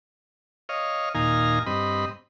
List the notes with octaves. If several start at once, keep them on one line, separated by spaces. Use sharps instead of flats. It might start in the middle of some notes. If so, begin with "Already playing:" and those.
C#5 D#5 F5
D#2 A#2 D#4 F5 G#5 A#5
G2 C4 D#5 B5